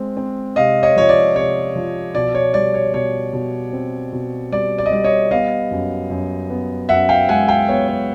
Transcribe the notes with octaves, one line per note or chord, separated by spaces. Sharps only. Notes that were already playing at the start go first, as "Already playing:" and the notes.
Already playing: G#3 C4
C4
C3 D#5 F5
C#5 D#5
F3 C#5
D5
C3 C#5
F3
B2 D5
C#5
G3 D5
C#5
B2 C#5
B2
C4
B2
G3 D5
D5
D#5
G3 D5
C#5 D#5
B3 D#5 F5
F#2
F#2
B3
F#2 E5 F#5
F5 G5
G#3 F#5 G#5
F5 G5
B3 C#5
C#5